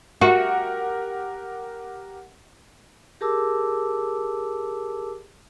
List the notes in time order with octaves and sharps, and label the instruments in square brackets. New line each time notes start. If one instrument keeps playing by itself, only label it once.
[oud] F#4 [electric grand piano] G4 A#4 F#5
[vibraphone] G4 G#4 A#4 A5 D6 E6